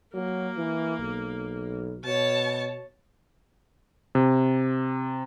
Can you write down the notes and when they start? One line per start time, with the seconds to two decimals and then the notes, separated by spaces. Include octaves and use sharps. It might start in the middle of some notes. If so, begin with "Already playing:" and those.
0.14 F#3 A#3
0.57 E3
1.01 B1
2.05 B2 C#5 A5
4.15 C3